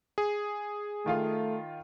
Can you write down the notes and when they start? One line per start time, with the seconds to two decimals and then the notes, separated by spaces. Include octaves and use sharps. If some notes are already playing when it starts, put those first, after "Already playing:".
0.18 G#4
1.06 D#3 A3 F4 F5